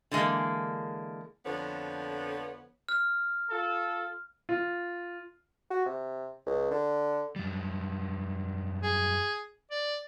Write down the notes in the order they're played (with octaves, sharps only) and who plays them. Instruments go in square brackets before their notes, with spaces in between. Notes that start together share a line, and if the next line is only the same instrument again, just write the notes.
[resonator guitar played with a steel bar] D3 E3 G#3 A#3
[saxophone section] F2 D3 F3 B3 C#5
[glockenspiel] F6
[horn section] F4 A4
[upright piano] F4
[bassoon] F#4
C3
C#2
D3
[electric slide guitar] F#2 G3
[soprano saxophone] G#4
D5